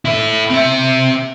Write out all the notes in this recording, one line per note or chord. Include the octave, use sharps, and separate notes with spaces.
E4 A4
C4 E5